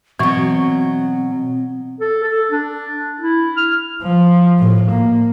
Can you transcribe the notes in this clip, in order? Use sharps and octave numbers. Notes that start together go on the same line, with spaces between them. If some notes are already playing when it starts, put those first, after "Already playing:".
B2 E3 F#3 C4 C#6
A4
A4
D4
E4
F6
F3
A2
A#3